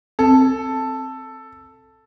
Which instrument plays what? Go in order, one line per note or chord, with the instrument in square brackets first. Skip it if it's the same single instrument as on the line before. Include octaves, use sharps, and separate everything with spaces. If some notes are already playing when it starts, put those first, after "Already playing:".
[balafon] C4 [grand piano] A4